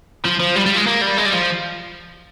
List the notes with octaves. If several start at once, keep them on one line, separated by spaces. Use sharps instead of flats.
F3
F3
G3
G3
G#3
A#3
G3
G#3
G3
F3